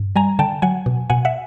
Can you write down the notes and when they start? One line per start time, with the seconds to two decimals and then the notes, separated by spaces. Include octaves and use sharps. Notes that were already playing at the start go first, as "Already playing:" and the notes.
Already playing: G2
0.16 G3 G#5 A#5
0.39 D3 G5 A5
0.62 F#3 F#5 G#5
0.86 B2
1.10 B2 F#5 G#5
1.25 E5 F#5